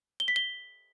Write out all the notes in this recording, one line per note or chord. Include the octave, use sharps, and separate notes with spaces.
G7
B6
G7